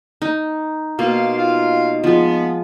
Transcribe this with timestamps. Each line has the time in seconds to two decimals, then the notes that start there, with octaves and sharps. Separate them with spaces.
0.22 D#4
0.99 B2 A#3 D#4 F5 C6
1.38 F4 F5
2.04 F3 G#3 B3